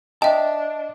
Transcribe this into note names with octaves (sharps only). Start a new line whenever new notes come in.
D4 D#5 E5 G5 A5